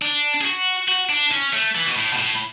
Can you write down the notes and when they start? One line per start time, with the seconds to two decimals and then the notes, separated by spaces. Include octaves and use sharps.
0.02 D4
0.41 G#4
0.45 F#4
0.88 F#4
1.10 D4
1.32 C#4
1.53 A3
1.75 E3
1.86 B2
1.96 A2
2.13 B2
2.18 A2